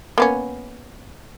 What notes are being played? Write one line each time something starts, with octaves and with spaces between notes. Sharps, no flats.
A#3 B3 C#4